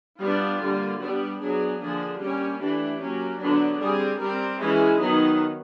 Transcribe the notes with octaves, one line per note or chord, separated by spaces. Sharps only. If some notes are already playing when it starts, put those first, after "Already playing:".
G3 B3 D4 F4
D3 G3 A#3
G3 B3 D4 G4
F#3 B3 D4 G#4
D3 F3 A#3 D4 G#4
G3 A#3 C#4 G4
E3 A3 D4 G4
F#3 A#3 C#4
D3 F#3 B3 D4
G3 C4 G#4
G3 C4 A#4
E3 G#3 C#4 E4
D#3 F#3 B3 D#4